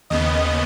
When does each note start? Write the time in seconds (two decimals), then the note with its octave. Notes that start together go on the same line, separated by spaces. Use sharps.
0.10 D#2 C#3 B3 D#5